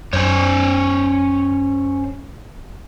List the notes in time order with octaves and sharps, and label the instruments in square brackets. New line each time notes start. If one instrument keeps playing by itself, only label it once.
[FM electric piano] F#2 [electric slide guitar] C#4 C5 C#5